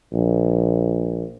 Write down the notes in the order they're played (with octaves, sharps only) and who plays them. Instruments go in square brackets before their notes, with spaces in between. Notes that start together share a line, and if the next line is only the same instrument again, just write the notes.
[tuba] A#1